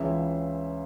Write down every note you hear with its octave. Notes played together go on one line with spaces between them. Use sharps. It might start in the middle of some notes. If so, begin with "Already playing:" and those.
Already playing: C#2 C#3 E3 E5